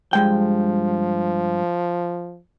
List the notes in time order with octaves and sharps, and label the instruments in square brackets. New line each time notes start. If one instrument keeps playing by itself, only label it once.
[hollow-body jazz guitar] G2 G#3 G5 [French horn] F3